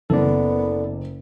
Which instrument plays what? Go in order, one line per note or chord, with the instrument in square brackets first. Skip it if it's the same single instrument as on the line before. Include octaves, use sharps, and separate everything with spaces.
[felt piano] F#1 [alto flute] B3 [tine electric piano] A4 D5